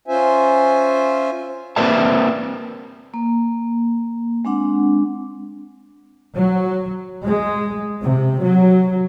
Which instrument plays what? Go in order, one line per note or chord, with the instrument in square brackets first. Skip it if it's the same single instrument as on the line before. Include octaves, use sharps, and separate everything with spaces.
[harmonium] C#4 F4 C5 E5 G#5
[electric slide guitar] A#3 C4 B4 D5 E5 A5
[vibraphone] A#3
G#3 C4 D4 F#5
[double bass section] F#3
G#3
C3
F#3